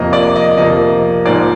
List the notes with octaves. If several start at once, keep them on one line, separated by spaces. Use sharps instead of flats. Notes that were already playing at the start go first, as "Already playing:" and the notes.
Already playing: F2 C3 F3 A#3 D#5
D5
D#5
F2 C3 F3 A#3 D#5
G#2 F3 A#3 D5